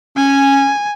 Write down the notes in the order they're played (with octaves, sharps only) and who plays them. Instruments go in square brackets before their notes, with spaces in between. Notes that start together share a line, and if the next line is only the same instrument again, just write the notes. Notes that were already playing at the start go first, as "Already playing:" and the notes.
[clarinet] C#4 [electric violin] G#5